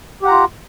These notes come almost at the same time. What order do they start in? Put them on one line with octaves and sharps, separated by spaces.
G4 F#5 A#5 F4